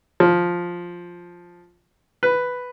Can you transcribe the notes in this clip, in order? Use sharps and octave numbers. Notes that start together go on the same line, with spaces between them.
F3
B4